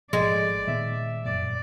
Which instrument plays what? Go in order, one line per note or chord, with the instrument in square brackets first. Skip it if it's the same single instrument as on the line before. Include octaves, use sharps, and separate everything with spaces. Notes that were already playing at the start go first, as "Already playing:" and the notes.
[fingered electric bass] A1 G#2 F3 [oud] G#3 [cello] D5
[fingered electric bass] A#2 D#3 B3 [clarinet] E5
[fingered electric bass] F1 F#2 A#2 [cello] D5